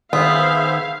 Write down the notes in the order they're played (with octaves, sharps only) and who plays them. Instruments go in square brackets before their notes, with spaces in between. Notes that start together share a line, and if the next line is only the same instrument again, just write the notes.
[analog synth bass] D#3 [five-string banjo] B3 [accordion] G#4 C5 E5 [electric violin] F5